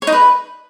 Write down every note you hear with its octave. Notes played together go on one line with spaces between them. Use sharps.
C#5
D#4
B4